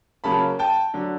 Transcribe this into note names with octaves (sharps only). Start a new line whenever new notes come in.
C#3 F#3 A#3 C#4 A5 B5
G5 A5
D3 F#3